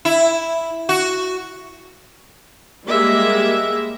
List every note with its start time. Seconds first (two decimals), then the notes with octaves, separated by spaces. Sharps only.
0.05 E4
0.89 F#4
2.86 G3 G#3 A#3 E5